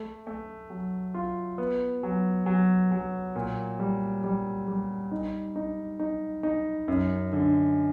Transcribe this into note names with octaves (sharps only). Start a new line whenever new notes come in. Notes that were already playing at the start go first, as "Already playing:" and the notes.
Already playing: A3
A3
F#3
F4
B3
F#3
F#3
F#3
A#2
G3
G3
G3
D#4
D#4
D#4
D#4
F#2
D3